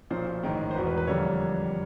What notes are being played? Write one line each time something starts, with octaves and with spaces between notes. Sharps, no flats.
B1 A#2 F3 C5
A1 G#2 D#3 G#3
C5
E1 E2 B2 B4
B4
B4
F2 D3 G3 A#3 C#5